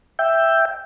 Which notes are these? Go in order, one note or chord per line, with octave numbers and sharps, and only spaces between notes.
E5 G5